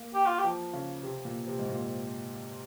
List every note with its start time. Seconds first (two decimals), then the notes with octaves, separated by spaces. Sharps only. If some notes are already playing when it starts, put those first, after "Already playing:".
Already playing: A#3
0.14 G4
0.26 F4
0.39 G4
0.44 F3
0.73 C#3
1.02 C3
1.25 A#2
1.47 C3
1.59 G#2
1.69 A#2